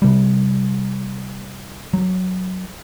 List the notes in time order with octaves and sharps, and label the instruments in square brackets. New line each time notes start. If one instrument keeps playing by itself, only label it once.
[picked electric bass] C3 G3
F#3